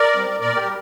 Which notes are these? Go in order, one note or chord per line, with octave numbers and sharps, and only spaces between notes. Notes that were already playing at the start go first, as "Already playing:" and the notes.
Already playing: A#4 D5
G3 C4
A#2 A#4 D5
G4 A#4
G3